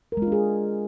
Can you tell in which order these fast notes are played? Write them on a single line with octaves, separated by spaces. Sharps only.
A#4 G#3 F4 D4 G#4